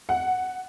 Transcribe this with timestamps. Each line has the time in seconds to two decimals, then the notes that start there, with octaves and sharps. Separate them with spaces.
0.09 F#5